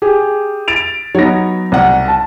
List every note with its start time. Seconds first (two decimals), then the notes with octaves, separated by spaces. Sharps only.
0.02 G4 G#4
0.68 A6 D7 F7
1.15 F#3 B3 D#4 C#5 A#6
1.72 C2 F#5
2.08 A5